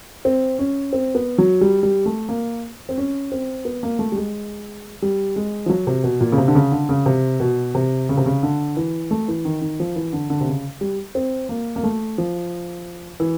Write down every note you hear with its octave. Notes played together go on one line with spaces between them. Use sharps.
C4
C#4
C4
B3
F#3
G3
G3
A3
A#3
C4
C#4
C4
B3
A#3
A3
G3
G#3
G3
G#3
F3
F#3
C3
B2
A#2
C#3
C3
D3
C#3
D3
C#3
C3
B2
C3
C#3
C3
C#3
D3
E3
A3
E3
D#3
D#3
F3
E3
D3
D3
C3
C#3
G3
C4
A#3
A#3
A3
F3
E3